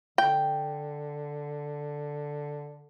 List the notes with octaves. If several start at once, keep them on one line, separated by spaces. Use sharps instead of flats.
D3 G5